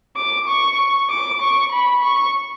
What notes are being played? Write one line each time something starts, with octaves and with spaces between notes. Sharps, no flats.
D6
C#6
D6
C#6
B5
C#6